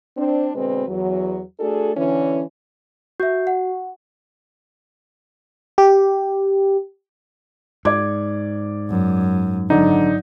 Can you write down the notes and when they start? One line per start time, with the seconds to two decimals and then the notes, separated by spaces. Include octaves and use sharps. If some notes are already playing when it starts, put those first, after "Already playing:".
0.17 C4 D4
0.54 B2 D3 G#3 C4 B4
0.87 E2 F#3
1.60 A3 D4 F#4 G#4 A4
1.96 D3 E3 C#4
3.20 F#4 E5 G6
3.47 F#5
5.78 G4
7.85 G#2 D5 D6 G#6
8.90 F#2
9.70 G#1 D3 F#3 D#4 D5